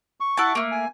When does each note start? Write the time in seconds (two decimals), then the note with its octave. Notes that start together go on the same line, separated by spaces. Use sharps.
0.20 C#6
0.37 E4 F#5 A5
0.55 A3 A#3
0.72 G#5